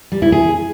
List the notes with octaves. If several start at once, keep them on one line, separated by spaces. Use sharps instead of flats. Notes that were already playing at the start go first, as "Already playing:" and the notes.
G3
E4
G#4